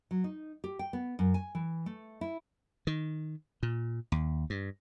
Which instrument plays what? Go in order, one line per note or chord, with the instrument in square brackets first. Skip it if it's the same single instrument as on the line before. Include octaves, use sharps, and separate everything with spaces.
[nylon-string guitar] F#3
D#4
G4
G5
B3
F#2
G#5
E3
A3
E4
[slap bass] D#3
A#2
D#2
G2